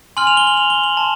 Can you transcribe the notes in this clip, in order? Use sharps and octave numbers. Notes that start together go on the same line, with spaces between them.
G#5 C6 F6 F#7
F7
G7
F#7
F7
G7
F#7
A5 C6